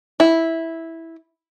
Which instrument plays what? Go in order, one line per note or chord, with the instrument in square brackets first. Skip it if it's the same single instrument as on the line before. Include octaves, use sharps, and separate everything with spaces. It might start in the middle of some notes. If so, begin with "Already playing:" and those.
[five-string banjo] E4